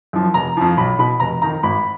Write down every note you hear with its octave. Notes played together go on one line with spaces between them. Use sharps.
F#2 F3
F1 A#5
F2 F3
B1 B5
B2 B5
F1 A#5
F2 D#3 A#5
G#1 B5